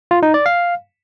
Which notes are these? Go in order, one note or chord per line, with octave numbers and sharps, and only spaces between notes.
F4
D#4
D5
F5